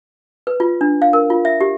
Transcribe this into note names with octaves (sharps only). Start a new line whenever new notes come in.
B4
F4
D4
F5
A#4
F4
E5
G4